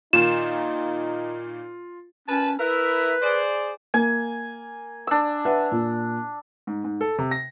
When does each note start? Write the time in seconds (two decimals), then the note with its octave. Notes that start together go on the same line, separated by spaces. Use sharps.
0.13 A#2 D#3 D#4 F4 E7
2.28 A#2 C#4 B4 A5
2.59 E4 A#4 B4 E5
3.22 G#4 C5 D5
3.94 A#3 G#5
5.07 D4 E6
5.45 B4 E5 F#5
5.72 A#2
6.67 G#2
6.84 G#2
7.01 A4
7.18 C3
7.31 A#6